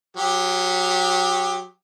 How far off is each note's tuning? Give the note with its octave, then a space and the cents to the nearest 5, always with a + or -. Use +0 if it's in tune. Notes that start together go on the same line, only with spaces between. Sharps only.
F#3 -20 G4 +15